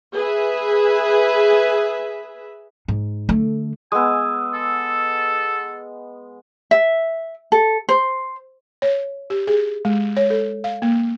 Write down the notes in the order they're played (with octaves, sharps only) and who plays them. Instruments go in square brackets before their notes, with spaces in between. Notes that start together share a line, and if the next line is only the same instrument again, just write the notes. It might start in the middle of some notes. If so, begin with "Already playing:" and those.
[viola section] G#4 B4 E5
[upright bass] G#2
D3 A3
[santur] G#3 B3 [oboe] G#5 [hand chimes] D#6 E6
[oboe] A4
[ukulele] E5
A4
C5
[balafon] C#5
G4
G#4
G#3
C#5
A4
F5
A#3